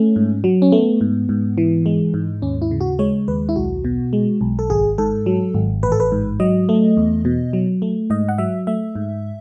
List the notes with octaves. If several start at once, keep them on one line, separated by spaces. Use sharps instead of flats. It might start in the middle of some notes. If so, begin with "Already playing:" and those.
Already playing: A3 C#4
G#2
F#3
C#4
A3 B3
G#2
G#2
E3
G#3
G#2
D#2 C#4
E4
C#3
F#4
G#3 C#5
D#2 B4
E4
B1 F#4
B2
G#3
B1
A4
G#1 G#4
G#2 A4
F#3
G#1
A1 B4
A4
B4
G#2
F#3 D#5
A3
E2
B2
F#3
A3
G#2 D#5
F#5
F#3 E5
A3 E5
G#2